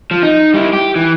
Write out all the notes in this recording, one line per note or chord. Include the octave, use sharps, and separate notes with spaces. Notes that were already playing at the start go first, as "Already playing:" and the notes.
F3
D#4
G3 E4
G4
E3